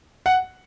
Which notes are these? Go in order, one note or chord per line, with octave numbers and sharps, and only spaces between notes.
F#5